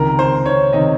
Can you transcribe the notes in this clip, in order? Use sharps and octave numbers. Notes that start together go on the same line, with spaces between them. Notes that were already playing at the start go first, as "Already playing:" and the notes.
Already playing: C#2 C3 D#3 A#4
C5
C#5
C3 D#3 D#5